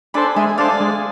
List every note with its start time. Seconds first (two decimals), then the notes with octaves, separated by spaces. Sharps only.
0.14 D4 A4 C5 G#5 B5
0.36 G#3 E5 G#5
0.58 D4 A4 C5 D5 F5
0.80 G#3